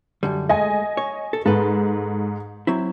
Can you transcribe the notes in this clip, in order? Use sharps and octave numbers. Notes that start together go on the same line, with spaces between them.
F#2 D3 G3
G#3 A3 D#5 G#5
C#5
A4
G#2 A4 B4
F#3 C4 E4